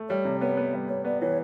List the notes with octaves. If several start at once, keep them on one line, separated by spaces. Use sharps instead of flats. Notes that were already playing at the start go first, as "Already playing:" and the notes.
Already playing: A3
G3 C#5
C3
B3 C#5
B3
G3
B3 C#5
B3 D5
E3 C#5